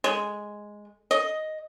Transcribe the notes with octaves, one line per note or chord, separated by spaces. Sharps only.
G#3
D#5